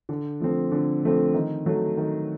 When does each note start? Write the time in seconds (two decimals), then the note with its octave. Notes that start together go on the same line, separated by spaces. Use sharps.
0.09 D3
0.40 F3 A3 C4
0.72 D3
1.03 F3 A3 C4
1.34 D#3
1.66 F#3 A3
1.97 D#3